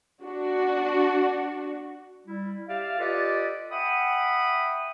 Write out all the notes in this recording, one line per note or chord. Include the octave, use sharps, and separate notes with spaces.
D4 F#4
G3 E4
G4 D5 E5 F5
F4 G4 A4 B4 D5 D#5
E5 F#5 G5 B5 D#6